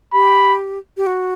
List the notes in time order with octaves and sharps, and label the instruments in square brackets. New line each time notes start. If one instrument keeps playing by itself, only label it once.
[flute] G4 [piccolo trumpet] B5
[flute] G4
F#4